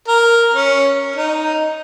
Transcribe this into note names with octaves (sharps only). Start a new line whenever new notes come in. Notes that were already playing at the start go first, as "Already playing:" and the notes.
A#4
C#4
D#4